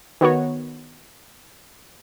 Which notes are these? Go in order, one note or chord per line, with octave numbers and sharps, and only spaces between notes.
D#3 B3 F#4 C#5